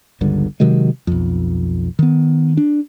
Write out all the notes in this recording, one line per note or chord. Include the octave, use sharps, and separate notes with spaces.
G1 C#2 G2 D3
C3 D#3 F#3 G#3
B1 F2
D#3 B3
D4